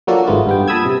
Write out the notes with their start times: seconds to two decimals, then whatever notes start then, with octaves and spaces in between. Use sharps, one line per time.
0.07 F3 F#3 A#3 D4 F#4 A4
0.27 G#1 G#2 F3 A3 B3 F4
0.46 G2 B3 G5
0.68 A#2 A5 B5 D#6 E6 G#6
0.85 C3